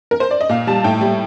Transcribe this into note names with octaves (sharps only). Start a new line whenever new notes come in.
A#4
C5
D5
D#5
A#2 F5
G3 A5
A2 G5
G3